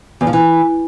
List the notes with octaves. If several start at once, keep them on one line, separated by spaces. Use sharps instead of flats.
E2
F3
E3